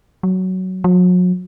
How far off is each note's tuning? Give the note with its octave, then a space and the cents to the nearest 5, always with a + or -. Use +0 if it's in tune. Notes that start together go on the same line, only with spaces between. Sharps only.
F#3 +10
F#3 -40